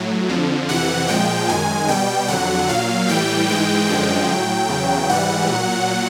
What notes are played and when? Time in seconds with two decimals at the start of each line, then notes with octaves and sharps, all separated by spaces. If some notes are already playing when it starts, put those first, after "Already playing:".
Already playing: A2 F#3
0.28 F2 D3 F3
0.68 F2 C3 E3 F#5
1.08 A#2 F3 G#3 G5
1.49 F#2 D#3 G#3 G#5
1.88 B2 G3 G5
2.28 F2 D3 F#3 F#5
2.69 A#2 F#3 F5
3.08 A2 E3 G3 G5
3.48 G#2 E3 G#3 G5
3.89 F#2 D3 F3 G#3 G5
4.28 A2 F#3
4.69 E2 C#3 F#3
5.09 G#2 E3 G3 F#5
5.49 A#2 F#3